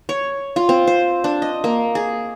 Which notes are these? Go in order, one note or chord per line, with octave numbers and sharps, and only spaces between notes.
C#5
F4
C4
C5
D4
D#5
A#3
G#4